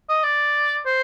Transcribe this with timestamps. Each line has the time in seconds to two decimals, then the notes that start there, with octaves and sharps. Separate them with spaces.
0.09 D#5
0.24 D5
0.86 C5